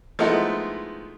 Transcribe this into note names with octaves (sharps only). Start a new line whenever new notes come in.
F3 G#3 A3 B3 D#4 E4